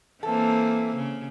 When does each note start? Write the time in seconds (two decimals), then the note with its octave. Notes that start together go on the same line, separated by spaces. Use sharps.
0.23 E3 A#3 C4 A4
0.96 C#3